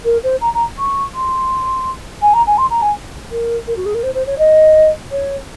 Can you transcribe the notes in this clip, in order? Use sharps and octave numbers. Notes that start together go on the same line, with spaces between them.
A#4
C5
A#5
A#5
C#6
C6
G#5
A#5
G#5
C6
A#5
G#5
A#4
A#4
F#4
G#4
A#4
C5
C5
C#5
D#5
C#5